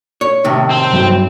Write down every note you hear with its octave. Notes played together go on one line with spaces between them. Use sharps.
C#5
A2 C3 D#3
C4
G2 F#3 A3